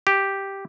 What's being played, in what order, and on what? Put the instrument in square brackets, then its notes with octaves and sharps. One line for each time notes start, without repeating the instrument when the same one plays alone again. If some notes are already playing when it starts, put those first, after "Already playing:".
[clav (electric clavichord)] G4